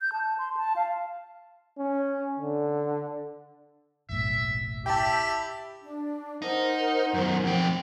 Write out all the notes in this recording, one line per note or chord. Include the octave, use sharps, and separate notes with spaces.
G6
A5
C6
A5
F5
C#4
D3
F#1 B1 A2 E5
E4 G4 E5 G5 A5
D4
D#4 A#4 C5 F#5
F#2 D#3
F2 G4